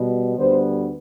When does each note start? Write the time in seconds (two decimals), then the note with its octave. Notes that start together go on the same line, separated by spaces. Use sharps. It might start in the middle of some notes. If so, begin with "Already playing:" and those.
Already playing: B2 G3 B3
0.36 D2 D3 G3 B3 C5